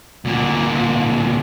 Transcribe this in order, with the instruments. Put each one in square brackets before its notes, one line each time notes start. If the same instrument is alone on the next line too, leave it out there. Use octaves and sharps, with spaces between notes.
[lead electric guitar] D2 A#2